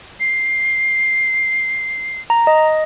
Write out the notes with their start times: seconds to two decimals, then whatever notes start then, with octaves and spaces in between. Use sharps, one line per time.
0.20 C7
2.30 A#5
2.47 D#5